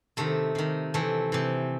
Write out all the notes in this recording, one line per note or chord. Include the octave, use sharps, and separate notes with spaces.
C3 D#3 A3
C3 D#3
C3 E3 A3
C3 E3